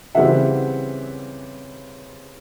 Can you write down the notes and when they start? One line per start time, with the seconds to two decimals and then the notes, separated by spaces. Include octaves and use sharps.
0.15 C#3 E3 G3 C4 E5 F#5